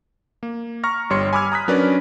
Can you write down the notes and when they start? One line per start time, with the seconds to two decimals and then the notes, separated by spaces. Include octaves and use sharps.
0.43 A#3
0.83 A#5 C#6 F6 A#6
1.10 G1 G3 C#5 C6 C#7
1.33 G#5 B5 D6 E6 F6 G#6
1.52 A#5 D#6 F#6 B6
1.68 F#3 C#4 D4 A#4 B4 D5